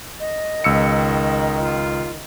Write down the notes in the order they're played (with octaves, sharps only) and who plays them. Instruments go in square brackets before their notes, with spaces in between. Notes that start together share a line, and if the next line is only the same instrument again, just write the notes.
[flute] D#5
[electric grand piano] C#2 E6 C#7 [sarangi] D#3
[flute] F4